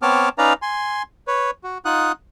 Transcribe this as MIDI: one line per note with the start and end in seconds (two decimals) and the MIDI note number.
0.02 0.29 59
0.02 0.29 60
0.02 0.29 73
0.02 0.29 81
0.02 0.29 86
0.02 0.29 89
0.38 0.53 61
0.38 0.53 63
0.38 0.53 71
0.38 0.53 74
0.38 0.53 77
0.38 0.53 82
0.62 1.03 80
0.62 1.03 84
1.27 1.51 71
1.27 1.51 73
1.64 1.78 66
1.85 2.12 63
1.85 2.12 65
1.85 2.12 78
1.85 2.12 87
1.85 2.12 90